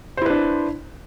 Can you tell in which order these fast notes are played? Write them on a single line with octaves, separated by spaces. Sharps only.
C5 E4 B4 D4